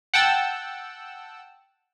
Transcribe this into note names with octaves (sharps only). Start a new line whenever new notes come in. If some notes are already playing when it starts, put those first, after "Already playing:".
F#5 G5 A5 E6